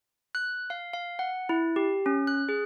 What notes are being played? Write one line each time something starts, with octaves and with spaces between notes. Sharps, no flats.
F#6
F5
F5
F#5
E4
G4
C#4
F#6
G#4